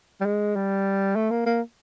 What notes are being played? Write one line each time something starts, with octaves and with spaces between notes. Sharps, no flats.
G3
G#3
G3
A3
A#3
A#3